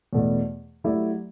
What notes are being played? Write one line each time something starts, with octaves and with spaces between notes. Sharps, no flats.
E2 B2 A3
F#3 A3 E4 G4 D5